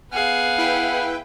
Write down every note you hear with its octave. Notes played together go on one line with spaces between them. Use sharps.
B3 G#4 F5 F#5
E4 B4 G5